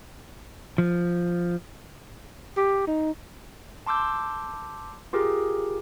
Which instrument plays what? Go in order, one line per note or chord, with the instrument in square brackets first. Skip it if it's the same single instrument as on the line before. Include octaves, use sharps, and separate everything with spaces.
[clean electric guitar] F3
[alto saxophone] G4
D#4
[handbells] A5 C6 D6 E6 G6
F4 G4 G#4 A#4